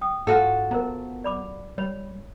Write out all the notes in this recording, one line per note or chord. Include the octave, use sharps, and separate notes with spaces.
G5 D#6
G#2 F4 F#4 A4
B3 A#4 C5 A#5
D5 B5 D6
G3 C#5 B5